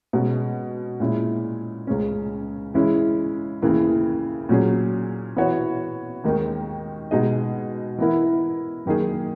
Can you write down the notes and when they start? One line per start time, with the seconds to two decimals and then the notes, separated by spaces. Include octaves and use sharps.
0.13 B2 G#3 C#4
1.00 A#2 G#3 C#4 E4
1.87 C#2 C#3 G#3 C#4
2.74 C#3 E3 G#3 C#4 E4
3.62 D#2 C#3 E3 A#3 E4
4.49 A#2 F#3 C#4 G#4
5.36 E3 B3 F#4 C#5
6.24 D#2 D#3 G#3 D#4 A#4
7.11 B2 G#3 D#4 G#4 D#5
7.98 E3 B3 E4 A#4
8.86 F#2 D#3 A#3 D#4 G#4